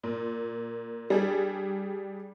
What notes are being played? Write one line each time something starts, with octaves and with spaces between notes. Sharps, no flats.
A#2
G3 D4 G#4